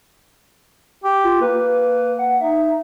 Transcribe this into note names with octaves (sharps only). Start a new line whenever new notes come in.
G4
F4
A#3 B4
F#5
D#4 E5